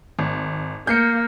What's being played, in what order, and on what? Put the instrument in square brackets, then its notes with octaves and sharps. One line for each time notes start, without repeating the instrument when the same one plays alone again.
[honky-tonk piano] G#1
[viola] A#3 [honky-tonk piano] G6 C7 C#7